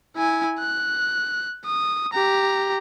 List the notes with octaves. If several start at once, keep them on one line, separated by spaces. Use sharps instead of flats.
E4 G#5
F#6
D#6
G4 A#5